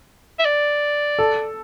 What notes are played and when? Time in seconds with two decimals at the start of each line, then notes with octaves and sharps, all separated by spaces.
0.39 E5
0.45 D5
1.19 A4